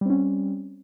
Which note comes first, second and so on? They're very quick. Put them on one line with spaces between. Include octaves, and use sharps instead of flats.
G3 C4 C#4